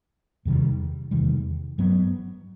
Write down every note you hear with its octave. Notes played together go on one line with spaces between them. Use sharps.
E2 C3 D#3 G3
E2 C3 D#3 G3
G2 F#3 B3